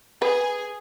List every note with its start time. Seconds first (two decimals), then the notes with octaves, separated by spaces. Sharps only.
0.22 G#4 B4